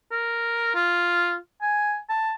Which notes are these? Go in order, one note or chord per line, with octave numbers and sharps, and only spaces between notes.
A#4
F4
G#5
A5